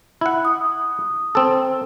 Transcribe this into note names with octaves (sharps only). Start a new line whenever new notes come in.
E4 F#5
D#6
C4 A4